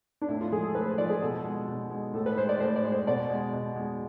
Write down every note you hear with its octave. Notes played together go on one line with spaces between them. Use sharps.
D4
A2 E4
F4
F3 G#3 G#4
A4
A2 B4
C5
F3 G#3 D5
G#4
B2 A4
G#3
B2
G#3
A2 A4
B4
G#3 C5
D5
A2 C5
D5
G#3
C5
B2 D5
G#3
B2
G#3